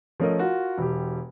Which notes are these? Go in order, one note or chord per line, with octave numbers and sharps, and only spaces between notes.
F3 A3 C#4 A#4 D#5
F4 F#4 A#4
E1 G4